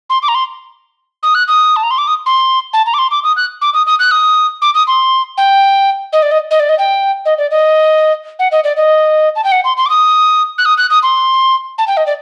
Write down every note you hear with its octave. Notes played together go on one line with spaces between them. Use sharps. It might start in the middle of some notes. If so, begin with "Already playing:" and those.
C6
D6
A#5
C6
D#6
F#6
D#6
A5
A#5
C6
D6
D#6
C6
A5
A#5
D6
C6
D6
D#6
F#6
D6
D#6
D#6
F#6
D#6
D6
D#6
C6
G5
D#5
D5
D#5
D#5
D5
D#5
G5
D#5
D5
D#5
F#5
D#5
D5
D#5
A5
G5
F#5
C6
C6
D6
D#6
F#6
D#6
F#6
D#6
C6
A5
G5
D#5
D5